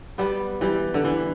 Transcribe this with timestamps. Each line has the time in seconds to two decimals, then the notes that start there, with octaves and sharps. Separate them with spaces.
0.18 G3 B3
0.61 E3 G3
0.94 D3
1.05 E3